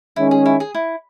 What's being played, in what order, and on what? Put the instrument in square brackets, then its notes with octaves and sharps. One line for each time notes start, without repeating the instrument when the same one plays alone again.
[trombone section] D#3 G#3 C#4 [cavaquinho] E4
[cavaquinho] G#4
E4
G#4
E4